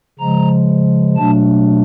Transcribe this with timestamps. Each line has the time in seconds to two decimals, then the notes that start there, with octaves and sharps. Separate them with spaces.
0.20 C#3 F3 G#3 A#5
1.16 B2 F#3 A3 D4 A5